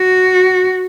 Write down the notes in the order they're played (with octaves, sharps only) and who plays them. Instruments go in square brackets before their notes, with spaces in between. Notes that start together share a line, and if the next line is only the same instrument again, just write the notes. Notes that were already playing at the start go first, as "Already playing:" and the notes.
Already playing: [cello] F#4